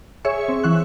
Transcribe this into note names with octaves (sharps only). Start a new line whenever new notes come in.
G#4 C#5 E5 C#6
C4
E3 E5 C#6 F#6